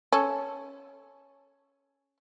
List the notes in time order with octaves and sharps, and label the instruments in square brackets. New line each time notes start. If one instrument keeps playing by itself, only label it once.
[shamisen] C#4 A4